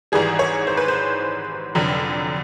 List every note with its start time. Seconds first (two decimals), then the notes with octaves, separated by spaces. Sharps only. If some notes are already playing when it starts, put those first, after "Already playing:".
0.12 G#1 G#2 E3 G3 G#4
0.39 C#5
0.67 C5
0.77 B4
0.88 C5
1.75 F1 F2 D3 F#3